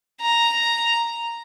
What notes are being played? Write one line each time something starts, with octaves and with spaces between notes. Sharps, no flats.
A#5